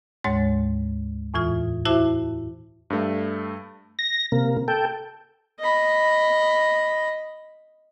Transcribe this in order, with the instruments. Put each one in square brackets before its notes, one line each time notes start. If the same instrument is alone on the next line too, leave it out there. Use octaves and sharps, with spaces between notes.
[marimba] D2 G#2 G#3 C#5 A6
E2 A2 E3 F4 D#6
E4 F#4 C5 E5 A5 D6
[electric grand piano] G2 A3
[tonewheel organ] A#6
C3 A#3
A4 G5
[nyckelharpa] D#5 B5